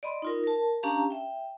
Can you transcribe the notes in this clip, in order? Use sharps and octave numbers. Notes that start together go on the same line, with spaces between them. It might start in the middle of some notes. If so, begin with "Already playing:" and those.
D5 D#5 B5 C6
D#4 F4 A#4
A#4 A5
C#4 D4 G4 F5 A5 A#5
E5 G5